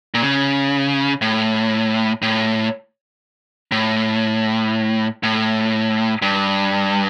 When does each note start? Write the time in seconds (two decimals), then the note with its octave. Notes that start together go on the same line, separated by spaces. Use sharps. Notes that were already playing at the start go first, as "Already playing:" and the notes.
0.14 A#2
0.22 C#3
1.21 A2
2.22 A2
3.72 A2
5.23 A2
6.22 G2